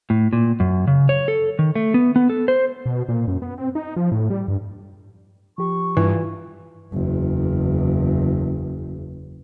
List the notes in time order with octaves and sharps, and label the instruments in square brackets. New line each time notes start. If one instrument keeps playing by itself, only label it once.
[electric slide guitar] A2
A#2
F#2
C#3
C#5
A4
D#3
A3
B3
B3
A4
C5
[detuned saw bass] B2
A#2
F#2
B3
C4
D#4
F3
A2
G3
G2
[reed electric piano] F3 G4 [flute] C#6
[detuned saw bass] G2 [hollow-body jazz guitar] E3 [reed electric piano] F4
[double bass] F#1 E2